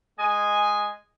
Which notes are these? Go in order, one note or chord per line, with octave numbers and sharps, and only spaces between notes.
G#3 D#5 G#5